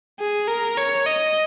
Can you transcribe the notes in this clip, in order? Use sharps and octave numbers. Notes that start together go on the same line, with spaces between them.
G#4
A#4
C#5
D#5